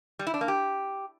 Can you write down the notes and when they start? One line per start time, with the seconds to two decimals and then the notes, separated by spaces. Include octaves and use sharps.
0.19 G3
0.27 E4
0.34 D4
0.41 A#3
0.48 G4